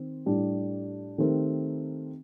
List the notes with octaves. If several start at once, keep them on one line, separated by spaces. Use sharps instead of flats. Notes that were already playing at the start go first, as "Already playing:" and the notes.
Already playing: D#3 C4
A2 G3 D4 G4
D#3 A3 C4 G4 A#4